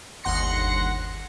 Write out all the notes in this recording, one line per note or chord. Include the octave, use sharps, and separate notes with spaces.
G1 D#2 F#5 C6 A#6 C#7